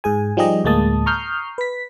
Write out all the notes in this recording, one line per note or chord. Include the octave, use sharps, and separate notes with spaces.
G#2 G#4 G#5
F3 G3 D#4 G4 G#4 D#5
D2 A2 G#3 A#3 A5 D#6
A#5 C#6 D#6 F6 G6 C7
B4 B6